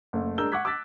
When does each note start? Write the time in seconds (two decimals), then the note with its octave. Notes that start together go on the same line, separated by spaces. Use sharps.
0.13 F#1 A3
0.38 G#3 D4 A#4 E6 G6 G7
0.52 F#5 C#6 D6 F#6 G#6 B6
0.65 D6 E6 F#6 A6 B6